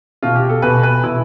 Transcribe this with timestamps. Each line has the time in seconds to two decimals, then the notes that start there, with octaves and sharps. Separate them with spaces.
0.23 B2 F4
0.36 G4
0.49 A4
0.62 B2 B4
0.83 B4
1.04 B2 E4